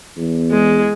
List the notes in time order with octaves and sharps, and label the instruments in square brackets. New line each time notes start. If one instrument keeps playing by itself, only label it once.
[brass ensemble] E2
[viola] G#3